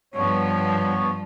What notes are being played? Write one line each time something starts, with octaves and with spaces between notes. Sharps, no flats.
G2 F3 B3 C#5